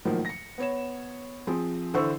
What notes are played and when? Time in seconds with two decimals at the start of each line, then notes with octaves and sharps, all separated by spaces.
0.05 A2 D#3 F3 F#3 A#3
0.25 A#6 C#7
0.58 B3 C#5 E7
1.47 F3 C4 G#4
1.94 D3 E3 C5 C#6 E6